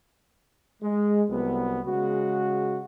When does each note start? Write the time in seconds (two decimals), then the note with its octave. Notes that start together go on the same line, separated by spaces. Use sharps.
0.83 G#3
1.30 C2 F#3 B3
1.86 C#3 G#3 F#4